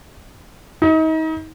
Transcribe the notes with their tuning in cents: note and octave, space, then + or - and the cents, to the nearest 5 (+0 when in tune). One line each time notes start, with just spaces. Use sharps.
D#4 +35